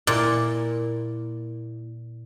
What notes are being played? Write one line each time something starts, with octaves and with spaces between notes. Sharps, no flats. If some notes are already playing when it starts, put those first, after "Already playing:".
A#2 A#3 E4 A#4